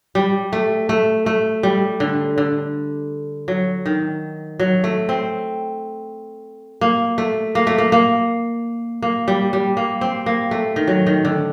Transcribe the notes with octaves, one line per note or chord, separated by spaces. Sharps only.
G3
A3
A3
A3
G3
D3
D3
F#3
D#3
F#3
A3
C4
A#3
A3
A#3
A3
A#3
A#3
A#3
G3
G3
A#3
C4
A#3
A3
D#3
F#3
D#3
D3